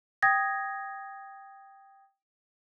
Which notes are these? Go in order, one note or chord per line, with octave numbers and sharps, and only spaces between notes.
G5 D#6 G#6 A#6